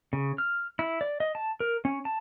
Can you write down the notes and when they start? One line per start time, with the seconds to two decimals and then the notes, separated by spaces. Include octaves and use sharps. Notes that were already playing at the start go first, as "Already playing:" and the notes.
0.13 C#3
0.38 F6
0.79 E4
1.01 D5
1.20 D#5
1.35 A5
1.60 A#4
1.85 C#4
2.05 A5